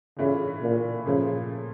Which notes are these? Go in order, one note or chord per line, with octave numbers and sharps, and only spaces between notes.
A2 C#3 E3 A3 D4 F4
A#2
A#2 C#3 F3 A3